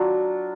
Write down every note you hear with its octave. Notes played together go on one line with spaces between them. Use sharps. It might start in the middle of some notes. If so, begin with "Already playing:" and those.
Already playing: F#3 D4 F4